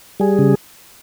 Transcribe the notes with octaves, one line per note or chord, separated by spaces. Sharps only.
G3 G#4
C#3